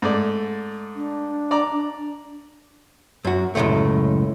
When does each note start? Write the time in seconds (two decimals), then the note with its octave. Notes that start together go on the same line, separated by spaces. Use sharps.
0.02 G#2 A3 D5
0.95 D4
1.51 D5 A#5 D6
3.25 F#2 F#4
3.55 C#2 F#2 A2 C3 A3